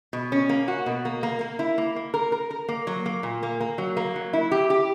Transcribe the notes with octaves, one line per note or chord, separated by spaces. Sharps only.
B2
C#4
A#3
F#4
B2
A#3
A#3
A#3
E4
A#3
A#3
A#4
A#4
A#4
A#3
F#3
A#3
A#2
A#3
A#3
F#3
A#3
F#3
E4
G4
G4